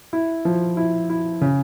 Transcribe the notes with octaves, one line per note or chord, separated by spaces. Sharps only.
E4
F3
E4
E4
C#3